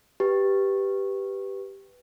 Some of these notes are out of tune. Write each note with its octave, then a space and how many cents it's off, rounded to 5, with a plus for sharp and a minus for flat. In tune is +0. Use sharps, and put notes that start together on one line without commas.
G4 +0 B4 +0